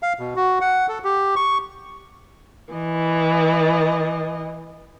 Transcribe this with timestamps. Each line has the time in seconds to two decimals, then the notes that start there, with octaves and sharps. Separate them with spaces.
0.03 F5
0.19 B2
0.36 F#4
0.61 F#5
0.89 A4
1.04 G4
1.36 C#6
2.73 E3 D#5